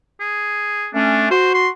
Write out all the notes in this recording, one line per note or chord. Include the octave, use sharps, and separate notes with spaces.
G#4
A3 C#4 D4
F#4 C5
C6